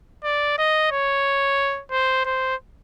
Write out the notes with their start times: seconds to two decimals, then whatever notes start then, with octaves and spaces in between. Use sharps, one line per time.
0.24 D5
0.58 D#5
0.91 C#5
1.92 C5
2.25 C5